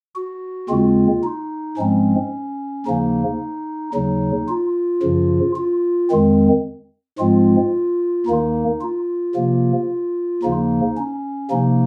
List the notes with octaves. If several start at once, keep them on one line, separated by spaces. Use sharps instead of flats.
F#4
D#2 C#3 G#3 C4 F4
D#4
G#2 F3 G#3 C4 C#4
D#2 C#3 F3 A#3 D#4
D#2 C#3 F#3 D#4
F4
F#2 C#3 F3
F4
F2 D#3 G#3 C4
G#2 F3 G#3 C4 F4
D#2 D#3 A#3 D#4
F4
C3 F3 A#3
D#2 C#3 F3 A#3 D#4
C#4
C3 F3 A#3 D#4